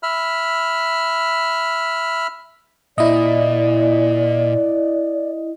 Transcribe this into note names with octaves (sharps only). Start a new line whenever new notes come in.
E5 B5 F6
A#2 E4 D5 D#5